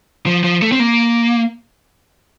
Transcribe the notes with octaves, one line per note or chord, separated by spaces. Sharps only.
F3
F3
A3
C4
A#3